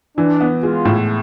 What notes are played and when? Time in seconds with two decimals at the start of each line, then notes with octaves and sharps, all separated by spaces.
0.18 E3 D4
0.41 B3
0.63 G#3 F4
0.85 A2